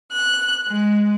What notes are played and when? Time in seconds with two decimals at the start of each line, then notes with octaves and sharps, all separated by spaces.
0.11 F#6
0.68 G#3